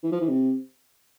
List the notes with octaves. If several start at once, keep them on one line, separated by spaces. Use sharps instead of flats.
E3
F3
E3
C3